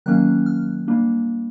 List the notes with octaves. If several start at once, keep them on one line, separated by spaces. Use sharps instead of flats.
D#3 F#3 A#3 C#4 F#6
F6
G3 A#3 D4